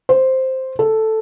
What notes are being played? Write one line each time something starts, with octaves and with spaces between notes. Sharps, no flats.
C5
A4